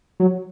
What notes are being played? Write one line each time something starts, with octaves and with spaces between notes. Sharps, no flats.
F#3